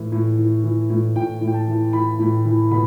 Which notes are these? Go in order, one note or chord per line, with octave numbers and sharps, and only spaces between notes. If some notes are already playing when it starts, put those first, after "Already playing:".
Already playing: A2 E3
A2
E3
E3
A2
A2 G5
A2
G5
A5
E3
E3 B5
A2
E3
B2 B5